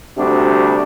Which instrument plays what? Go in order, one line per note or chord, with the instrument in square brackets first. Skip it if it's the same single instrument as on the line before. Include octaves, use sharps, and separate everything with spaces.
[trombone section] D2 C3 G3 D4 F#4